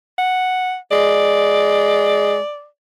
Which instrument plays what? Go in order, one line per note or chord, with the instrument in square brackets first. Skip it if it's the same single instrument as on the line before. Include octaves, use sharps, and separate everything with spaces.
[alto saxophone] F#5
[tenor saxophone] G#3 [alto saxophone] D5